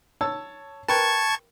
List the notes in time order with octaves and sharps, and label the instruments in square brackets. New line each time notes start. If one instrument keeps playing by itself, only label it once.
[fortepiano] C#5 A5 E6
[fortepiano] A#4 B4 G5 [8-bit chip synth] A5 C#6 G#6